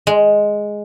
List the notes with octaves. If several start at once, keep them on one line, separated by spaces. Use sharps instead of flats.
G#3